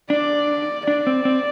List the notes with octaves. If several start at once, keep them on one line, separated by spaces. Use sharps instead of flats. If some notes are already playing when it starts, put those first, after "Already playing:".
D4 D5
D4 D5
C4
C4